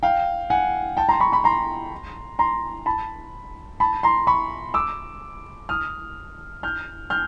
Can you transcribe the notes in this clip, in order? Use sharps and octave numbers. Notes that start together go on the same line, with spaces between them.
F5 G5
F#5 G#5
G5 A5
A#5 C6
B5 C#6
B5 C#6
A#5 C6
A#5 C6
A5 B5
A5 B5
A#5 C6
B5 C#6
D6 E6
D#6 F6
F6 G6
F6 G6